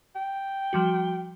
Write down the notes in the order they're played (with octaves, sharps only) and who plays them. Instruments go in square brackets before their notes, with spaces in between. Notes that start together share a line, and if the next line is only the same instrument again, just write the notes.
[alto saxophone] G5
[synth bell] F3 G3 F#4